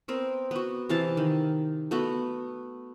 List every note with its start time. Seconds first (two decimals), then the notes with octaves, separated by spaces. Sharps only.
0.08 B3 C4 A#4
0.51 B3 F#4
0.89 C3 E3 F5 A5
1.17 D#3
1.91 A3 B3 F#4